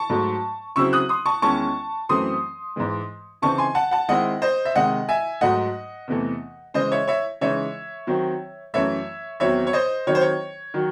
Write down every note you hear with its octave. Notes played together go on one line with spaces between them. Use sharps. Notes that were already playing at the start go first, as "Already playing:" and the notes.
Already playing: A5 C#6
G#2 F#3 A3
C#3 F#3 C4 E4 C#6 E6
D#6 F#6
C6 D#6
A5 C#6
E2 D#3 G#3 C#4 E4 A5 C#6
F#2 E3 A3 C4 C6 D#6
G#2 E3 G#3
C#3 E3 C4 D#4 A5 C#6
G#5 C6
F#5 A5
F#5 A5
D#3 G#3 C4 E4 D#5 F#5
C5 D#5
E5
C3 D#3 G#3 D#5 F#5
E5 G#5
G#2 F#3 A3 D#4 D#5 F#5
E2 C3 E3 A3
C#3 E3 G#3 C5 D#5
C#5 E5
C#5 E5
C#3 E3 G#3 D#4 C#5 E5
D#3 F#3 C4
F#2 E3 A3 C#5 E5
E2 D#3 F#3 C4 C#5 E5
C#5
C5 D#5
D#3 F#3 C4 D#4 C#5
C5
C#5
D#3 F#3